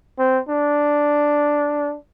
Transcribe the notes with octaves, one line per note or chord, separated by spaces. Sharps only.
C4
D4